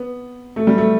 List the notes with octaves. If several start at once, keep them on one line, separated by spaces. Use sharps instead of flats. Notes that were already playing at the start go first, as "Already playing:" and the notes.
Already playing: B3
A3
G3
A3